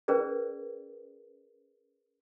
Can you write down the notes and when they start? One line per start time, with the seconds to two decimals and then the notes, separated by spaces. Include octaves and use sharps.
0.08 C#4 G#4 A#4 B4 D5